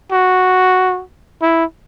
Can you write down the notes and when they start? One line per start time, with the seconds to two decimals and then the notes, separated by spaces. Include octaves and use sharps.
0.12 F#4
1.42 E4